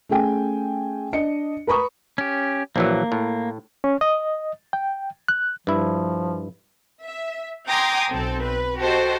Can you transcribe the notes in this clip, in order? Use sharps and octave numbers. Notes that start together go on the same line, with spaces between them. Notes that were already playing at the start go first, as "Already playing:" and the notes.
A3 C#4 G#4 G5 G#5
D4 D#5 C#7
B4 A#5 B5 C#6 D#6
C#4 G4
A#1 E3 F#3 A#3
A2
C#4
D#5
G5
F#6
G2 F3 E4
E5
G5 G#5 A#5 C6 D6 D#6
B1 C4 A4
B4
F#4 G4 A4 C5 D#5 G5